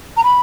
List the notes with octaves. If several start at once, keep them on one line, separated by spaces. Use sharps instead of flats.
A#5
B5